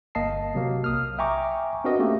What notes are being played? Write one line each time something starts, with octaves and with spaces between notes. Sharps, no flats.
G1 A#3 D#5 F5 A5 C7
C3 F#3 A#3
B1 D#6 F6
E5 G5 G#5 A#5 C#6 D6
C4 D4 F#4 A#4 B4 D#5
A3 A#3 C#4 G4 F5